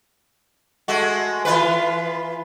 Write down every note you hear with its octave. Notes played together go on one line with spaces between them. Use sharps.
G#3 A3 F#4
E3 F4 B4